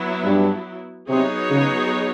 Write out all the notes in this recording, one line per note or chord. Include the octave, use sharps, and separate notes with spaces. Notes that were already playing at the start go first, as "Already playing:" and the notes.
Already playing: F#3 B3 E4
G2
C3 F#3 B3 D#4 G#4 C#5
C#3